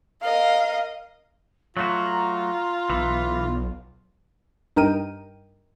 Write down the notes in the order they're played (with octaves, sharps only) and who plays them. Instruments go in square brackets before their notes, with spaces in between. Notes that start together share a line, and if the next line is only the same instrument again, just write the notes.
[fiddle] A#4 D#5 [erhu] F5
[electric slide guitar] F#3 A3 F#4 [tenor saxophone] F4 [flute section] A#5
[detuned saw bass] B1 [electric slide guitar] E3
[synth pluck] G2 D#4 A#4 G5 D#7